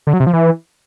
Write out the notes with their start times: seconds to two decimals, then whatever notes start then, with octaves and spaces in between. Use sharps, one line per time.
0.07 D3
0.13 F#3
0.20 C3
0.27 F3
0.33 E3